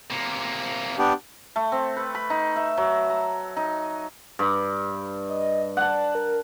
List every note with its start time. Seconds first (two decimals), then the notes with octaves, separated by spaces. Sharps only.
0.10 C3 A#3
0.98 B3 D4 G4
1.56 A3
1.72 C4
1.97 B4
2.15 B5
2.30 D#4
2.56 E5
2.77 F#3
3.10 A#5
3.57 D#4
4.39 G2
5.30 D#5
5.77 D5 F#5 A5
6.15 A#4